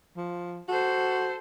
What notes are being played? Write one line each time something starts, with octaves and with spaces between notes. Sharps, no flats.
F3
F#4 A4 C5